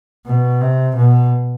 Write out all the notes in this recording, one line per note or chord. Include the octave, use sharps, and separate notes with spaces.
B2
C3
B2